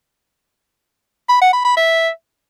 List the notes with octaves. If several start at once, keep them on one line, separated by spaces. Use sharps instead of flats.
B5
F#5
B5
B5
E5